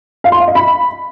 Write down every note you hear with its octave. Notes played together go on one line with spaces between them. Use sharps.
F5
C6
F5
D#5
B5